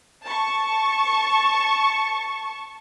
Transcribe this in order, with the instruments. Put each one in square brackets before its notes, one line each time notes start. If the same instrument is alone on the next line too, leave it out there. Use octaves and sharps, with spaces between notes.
[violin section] A5 C#6